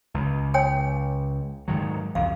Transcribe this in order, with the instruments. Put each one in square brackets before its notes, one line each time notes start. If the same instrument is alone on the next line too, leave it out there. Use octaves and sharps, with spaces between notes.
[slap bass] C#2
[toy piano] C#5 G5 G#5
[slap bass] G#2 D#3 F#3
[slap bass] C2 F2 [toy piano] F5